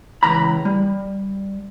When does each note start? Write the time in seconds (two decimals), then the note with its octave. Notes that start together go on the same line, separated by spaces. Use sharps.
0.23 C#2 G2 E3 A#5 B5
0.65 G3